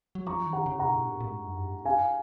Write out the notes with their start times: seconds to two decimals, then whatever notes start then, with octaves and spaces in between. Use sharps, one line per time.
0.15 F#3
0.27 F3 A#5 C#6
0.47 D#3
0.53 F#5 A#5
0.66 C#3
0.79 F#5 A#5
0.86 B2
1.06 A#2
1.20 A#2
1.25 G#2
1.46 F#2
1.66 G#2
1.85 F5 G#5